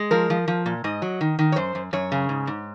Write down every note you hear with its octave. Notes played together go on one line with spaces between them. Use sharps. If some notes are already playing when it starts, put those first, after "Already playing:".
Already playing: G#3
F3 A#4
F3
F3
A#2
G#2 D#5
F#3
D#3
D#3
C#5
F#2 C5
F#2
F#2 C#5
C#3
G#2
G#2